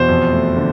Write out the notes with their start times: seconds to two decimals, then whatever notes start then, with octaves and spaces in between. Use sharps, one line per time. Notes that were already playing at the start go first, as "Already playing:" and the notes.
Already playing: E2 B2 C5
0.09 F2
0.32 A3
0.56 D3